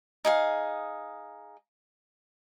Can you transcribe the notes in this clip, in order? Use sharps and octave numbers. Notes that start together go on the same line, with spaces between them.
D#4 G#4 F5